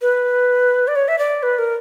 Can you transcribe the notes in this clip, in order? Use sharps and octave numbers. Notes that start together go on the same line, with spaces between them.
B4
D5
C#5
E5
D5
B4
A#4